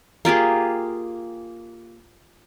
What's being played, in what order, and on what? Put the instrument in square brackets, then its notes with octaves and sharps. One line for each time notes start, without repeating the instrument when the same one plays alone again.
[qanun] A#3 F4 G4 G#4